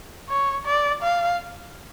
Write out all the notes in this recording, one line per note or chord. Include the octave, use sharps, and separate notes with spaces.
C#5
D5
F5